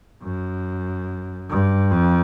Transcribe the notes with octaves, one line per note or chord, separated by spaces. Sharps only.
F#2
G2
F2